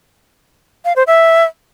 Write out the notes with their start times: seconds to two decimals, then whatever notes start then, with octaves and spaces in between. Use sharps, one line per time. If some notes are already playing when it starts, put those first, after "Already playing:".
0.85 F5
0.96 C5
1.07 E5